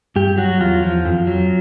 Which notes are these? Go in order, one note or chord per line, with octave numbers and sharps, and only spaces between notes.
G2 G4
F#3 F#4
E2 F4
F3
F2
F#3